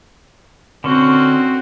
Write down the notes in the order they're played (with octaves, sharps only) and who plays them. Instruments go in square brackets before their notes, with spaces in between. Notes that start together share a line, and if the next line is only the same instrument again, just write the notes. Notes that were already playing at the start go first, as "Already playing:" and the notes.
[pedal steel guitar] D3 C#4 [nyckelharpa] C4 F#4